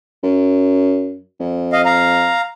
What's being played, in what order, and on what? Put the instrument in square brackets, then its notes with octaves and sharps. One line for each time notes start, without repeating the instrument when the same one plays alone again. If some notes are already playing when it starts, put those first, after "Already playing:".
[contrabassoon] F#2
F2
[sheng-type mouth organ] D#5 F5
F5 A#5